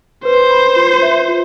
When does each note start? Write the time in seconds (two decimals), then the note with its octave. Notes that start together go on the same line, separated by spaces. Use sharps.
0.25 B4 C5
0.51 B5
0.76 F4
1.02 E5
1.28 F4